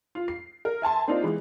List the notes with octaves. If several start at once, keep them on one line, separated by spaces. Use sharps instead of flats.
F4
C7
A#4
E5 G#5 A5 C6
A#3 C4 D4 D#4 F4 C5
E3 G#3 B3